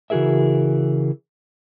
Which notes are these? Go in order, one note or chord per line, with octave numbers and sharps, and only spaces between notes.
C#3 E3 F#4 G#4 A#4 E5